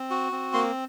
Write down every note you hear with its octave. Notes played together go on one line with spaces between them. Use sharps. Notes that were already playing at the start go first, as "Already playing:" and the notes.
Already playing: C4
F#4
C4
A#3 C6